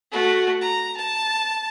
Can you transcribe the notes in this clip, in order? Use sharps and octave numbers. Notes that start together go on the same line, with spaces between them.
A3 F#4
A#5
A5